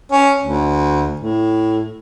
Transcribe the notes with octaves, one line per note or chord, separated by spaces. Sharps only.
C#4
D2
A2